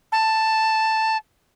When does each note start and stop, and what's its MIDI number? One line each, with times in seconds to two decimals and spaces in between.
0.12 1.17 81